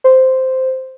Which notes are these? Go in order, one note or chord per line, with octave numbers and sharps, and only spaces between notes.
C5